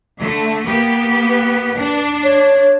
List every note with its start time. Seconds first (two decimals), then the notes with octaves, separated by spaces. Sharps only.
0.20 D3 A3
0.66 A#3 B3 G4
1.30 B4
1.76 D4
2.23 C#5